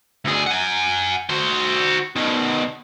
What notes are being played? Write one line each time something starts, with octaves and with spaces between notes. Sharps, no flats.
D2 G#4
F#5 G#5
F#4 C5
B2 D#3